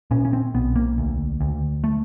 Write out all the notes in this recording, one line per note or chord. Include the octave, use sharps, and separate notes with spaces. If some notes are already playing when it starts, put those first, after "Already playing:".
A#2 C#4
C#4
C4
B1 B3
A#3
D2
D2
A3